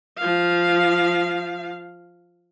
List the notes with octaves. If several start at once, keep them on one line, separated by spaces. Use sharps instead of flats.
F3 F5